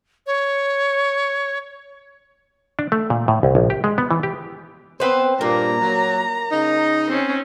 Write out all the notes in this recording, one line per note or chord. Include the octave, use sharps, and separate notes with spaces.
C#5
D4
A3
A#2
A2
C2
A#1
G4
G#3
B3
E3
G4
B3 C4 B4 C5
G2 A#2 A#3 A#5
F#3
C#3 D#4
C4 C#4